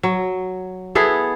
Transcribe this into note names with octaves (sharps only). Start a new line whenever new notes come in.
F#3
B3 E4 G#4 A4